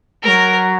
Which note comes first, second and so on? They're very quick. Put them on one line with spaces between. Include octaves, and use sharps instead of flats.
A3 A#4 F#3